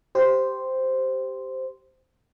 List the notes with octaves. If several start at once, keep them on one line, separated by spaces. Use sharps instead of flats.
G4 C5